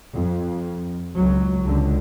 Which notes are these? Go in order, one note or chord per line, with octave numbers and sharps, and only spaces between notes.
F2
C#2 F#3
C#2 D3